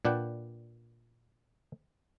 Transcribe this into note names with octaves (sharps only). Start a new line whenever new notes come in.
A#2 D4 B4 F#5 G5